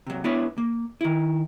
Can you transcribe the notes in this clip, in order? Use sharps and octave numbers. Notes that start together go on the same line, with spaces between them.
C3 F#3
B3 D4 E4 B4 C#5
A#3
D#3 E4